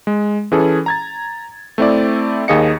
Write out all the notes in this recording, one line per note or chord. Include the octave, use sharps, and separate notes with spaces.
G#3
E3 C#4 G#4 A4
A#5 G#6 A6
A3 C4 E4 D5
D#2 D#3 G#4 D#5 F5 C#7